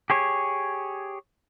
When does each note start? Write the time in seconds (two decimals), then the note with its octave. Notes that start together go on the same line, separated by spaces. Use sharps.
0.10 G4 G#4 C#5